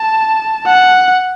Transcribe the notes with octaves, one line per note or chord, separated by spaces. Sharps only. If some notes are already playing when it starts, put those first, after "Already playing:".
Already playing: A5
F#5